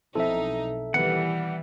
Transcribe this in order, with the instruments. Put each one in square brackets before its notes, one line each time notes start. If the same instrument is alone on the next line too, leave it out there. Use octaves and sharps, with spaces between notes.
[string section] B1 D#4 [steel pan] F3 C4 E4 [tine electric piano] A4 E5
[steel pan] D#3 B3 B4 [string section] E3 G3 [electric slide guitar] F#5